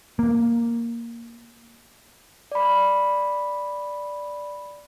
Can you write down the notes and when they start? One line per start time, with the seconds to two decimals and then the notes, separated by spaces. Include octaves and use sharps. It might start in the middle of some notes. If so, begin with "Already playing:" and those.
0.19 A#3
2.52 D5 B5